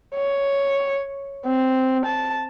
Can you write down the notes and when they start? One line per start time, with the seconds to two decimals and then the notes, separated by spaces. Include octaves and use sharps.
0.15 C#5
1.46 C4
2.06 A5